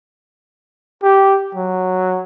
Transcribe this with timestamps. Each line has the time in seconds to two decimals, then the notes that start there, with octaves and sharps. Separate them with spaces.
1.03 G4
1.55 F#3